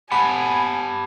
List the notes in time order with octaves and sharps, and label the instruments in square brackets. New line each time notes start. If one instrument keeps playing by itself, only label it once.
[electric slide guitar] G4 F#5 A5 [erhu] G#5 [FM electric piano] B5